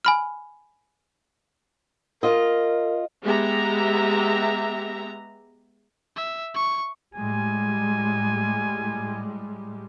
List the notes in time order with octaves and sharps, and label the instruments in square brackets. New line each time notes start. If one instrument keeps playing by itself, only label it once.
[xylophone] G#5 B5 F6
[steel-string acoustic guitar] F4 D#5 [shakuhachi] A#4
[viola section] G#3 B3 G4 E5 A#5
[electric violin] E5
C#6
[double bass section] A2 G3 G#3 [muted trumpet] G#5